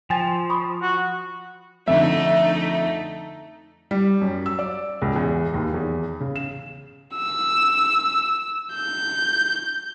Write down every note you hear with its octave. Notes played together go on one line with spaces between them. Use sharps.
F3 G5 G#5 A6
B5 C#6 D#6
F#4
F2 D3 A3 D#4 E5
G3
F#2
E6
D5
C#2
E2
D#2
E2
C#3
E7
E6
G6